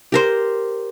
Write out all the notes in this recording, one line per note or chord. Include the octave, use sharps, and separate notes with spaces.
G4 A#4 C5